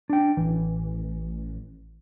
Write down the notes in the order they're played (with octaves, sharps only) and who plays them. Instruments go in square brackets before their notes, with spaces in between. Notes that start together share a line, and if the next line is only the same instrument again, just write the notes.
[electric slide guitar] D4 G5
[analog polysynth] A1 [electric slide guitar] E3